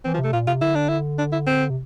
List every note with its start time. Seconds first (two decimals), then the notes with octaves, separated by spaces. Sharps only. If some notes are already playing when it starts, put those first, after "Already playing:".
0.05 E3 C4
0.14 F3
0.19 C3
0.24 A3
0.33 A#2 F4
0.47 C3 F4
0.61 D3 E4
0.75 D4
0.88 E4
1.19 D4
1.32 E4
1.47 C4
1.70 C3